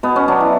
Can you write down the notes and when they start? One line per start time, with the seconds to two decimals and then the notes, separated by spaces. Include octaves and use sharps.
0.03 B2 B3
0.16 C#4
0.28 F#3 D4
0.40 E4